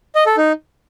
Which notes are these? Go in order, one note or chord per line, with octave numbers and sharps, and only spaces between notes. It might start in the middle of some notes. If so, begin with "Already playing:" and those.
D#5
A4
D#4